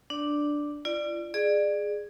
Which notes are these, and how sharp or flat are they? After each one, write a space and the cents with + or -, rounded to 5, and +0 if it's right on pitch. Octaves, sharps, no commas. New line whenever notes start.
D4 +0 D5 +0
F4 -45 D5 +15
G#4 +0 D5 +25